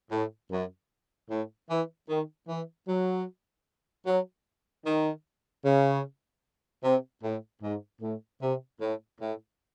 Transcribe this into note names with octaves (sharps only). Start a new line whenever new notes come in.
A2
F#2
A2
E3
D#3
E3
F#3
F#3
D#3
C#3
C3
A2
G#2
A2
C3
A2
A2